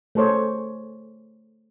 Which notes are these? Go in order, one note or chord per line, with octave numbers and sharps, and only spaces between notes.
A3 G#4 A4 C5 C#5